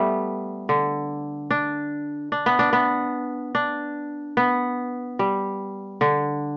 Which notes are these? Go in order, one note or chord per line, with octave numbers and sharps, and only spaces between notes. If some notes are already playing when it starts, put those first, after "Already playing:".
Already playing: G3 A3 B3
D3
D4
D4
B3
D4
B3
D4
B3
G3
D3